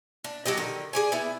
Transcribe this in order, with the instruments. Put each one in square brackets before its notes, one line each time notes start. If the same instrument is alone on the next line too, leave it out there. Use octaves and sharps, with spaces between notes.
[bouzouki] D4
F#3 D4 G4 D#5
D3 D#3
G#4 D5 G#5
B3 E4